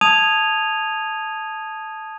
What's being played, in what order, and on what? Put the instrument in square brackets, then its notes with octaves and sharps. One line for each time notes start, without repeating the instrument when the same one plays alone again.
[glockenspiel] A5 D#6 G#6 D#7 F7